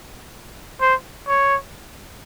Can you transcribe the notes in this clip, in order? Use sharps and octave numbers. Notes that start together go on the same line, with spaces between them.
C5
C#5